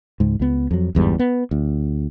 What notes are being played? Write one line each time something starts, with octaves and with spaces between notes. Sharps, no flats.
C#2 G#2
C#2 B3
F2 F#3
G1 E2 G#2 G3
B3
D2